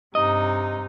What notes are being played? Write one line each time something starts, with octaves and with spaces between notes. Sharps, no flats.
G2 C3 D#4 D#5